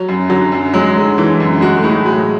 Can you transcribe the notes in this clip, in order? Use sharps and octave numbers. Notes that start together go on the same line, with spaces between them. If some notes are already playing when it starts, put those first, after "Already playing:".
Already playing: F#3
F#2
D3 F#3
F#2
F#3 G#3
D3
D3 E3
F#2
G#3 F#4
A3
A2 G#3
F#3 G#3